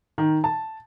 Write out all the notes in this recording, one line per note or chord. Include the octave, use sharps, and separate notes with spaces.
D#3
A5